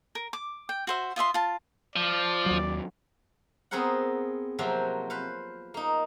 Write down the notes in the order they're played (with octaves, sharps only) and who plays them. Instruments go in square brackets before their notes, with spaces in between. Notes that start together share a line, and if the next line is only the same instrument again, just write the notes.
[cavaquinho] A#4
D6
G5
F#4 C5 E5
F4 D#5 E5 C6
F4 A5
[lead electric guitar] F3 [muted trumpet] D5
[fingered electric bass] D#2 F#3
[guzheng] B3 C4 G#4 A#4 C5 F#5
C3 F3 F#3 A#3 C4 F#4
B4 C5 F5
A#3 D#4